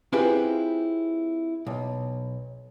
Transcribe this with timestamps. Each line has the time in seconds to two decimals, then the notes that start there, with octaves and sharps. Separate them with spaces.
0.13 C4 E4 F4 G4 G#4 B4
1.67 B1